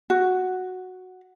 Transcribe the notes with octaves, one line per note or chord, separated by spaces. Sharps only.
F#4